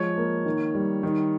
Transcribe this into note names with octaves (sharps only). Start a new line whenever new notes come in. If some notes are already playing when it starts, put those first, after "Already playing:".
Already playing: F3 G#3 C#5
A#3
D#3
G3
D#3